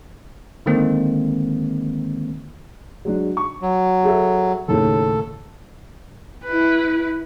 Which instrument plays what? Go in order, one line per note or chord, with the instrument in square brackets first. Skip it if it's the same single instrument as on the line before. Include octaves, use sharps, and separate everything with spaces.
[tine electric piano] D3 D#3 G#3 A#3 C4
[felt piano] F#3 G#3 D4
C#6
[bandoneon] F#3
[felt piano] G#4 A4 E5
[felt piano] D#2 A2 C#3 [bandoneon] A4
[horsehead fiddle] E4 B4